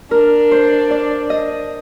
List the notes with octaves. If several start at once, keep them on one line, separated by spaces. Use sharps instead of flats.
D4 A#4
C5
D5
D#5